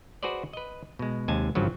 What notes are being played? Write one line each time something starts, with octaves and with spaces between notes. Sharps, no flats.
F#4 G#4 B4 C5 D5
B4 D#5
B2 G#3
D#2 C3 G#3 G#5 A5
G#1 G2 C#3 F3 F#3